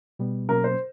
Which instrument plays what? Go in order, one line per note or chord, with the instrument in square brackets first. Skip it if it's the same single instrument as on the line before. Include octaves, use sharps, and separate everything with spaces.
[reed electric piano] B2 G3 B3
[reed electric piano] B2 F#3 A#3 C#4 [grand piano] A#4
[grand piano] C5